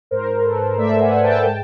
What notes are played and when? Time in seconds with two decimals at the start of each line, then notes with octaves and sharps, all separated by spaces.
0.11 G#2 A#4 C5
0.44 G#2 A4 B4
0.78 A3 D5 E5
1.01 F#5 G#5
1.12 G#2
1.23 G5 A5
1.45 G#3